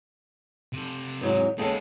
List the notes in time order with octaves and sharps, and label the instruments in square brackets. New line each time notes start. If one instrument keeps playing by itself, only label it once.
[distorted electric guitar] C3 A4
[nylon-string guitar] E2 G#2 F#3
[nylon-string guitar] D#2 C#3 A4 [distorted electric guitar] G#3 B3